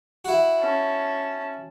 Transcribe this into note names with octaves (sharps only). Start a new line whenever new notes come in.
E4 F#4
C#4 A5